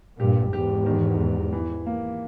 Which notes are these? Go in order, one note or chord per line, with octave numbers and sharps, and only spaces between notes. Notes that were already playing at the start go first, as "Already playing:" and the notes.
G2 A#2 G4
E2 G#2 G4
D#3
D#3
E3
A#3